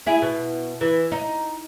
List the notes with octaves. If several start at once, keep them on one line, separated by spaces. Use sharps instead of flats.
E4 G#4
B2
E3
D#4